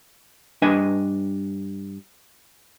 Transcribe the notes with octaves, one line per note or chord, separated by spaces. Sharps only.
G2 D4 B4 D#5 G#5